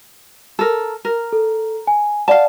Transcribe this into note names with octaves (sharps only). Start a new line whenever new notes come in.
A4 A#4
A#4
A4
G#5
D5 F5 F#5 A5